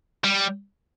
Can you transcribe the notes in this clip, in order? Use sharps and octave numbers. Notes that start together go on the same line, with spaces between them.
G3